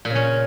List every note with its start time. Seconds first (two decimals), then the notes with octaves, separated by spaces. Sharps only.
0.05 A#2
0.10 C#3
0.15 C#4